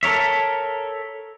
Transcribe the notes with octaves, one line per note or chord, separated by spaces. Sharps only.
A4 A#4 C#5 E5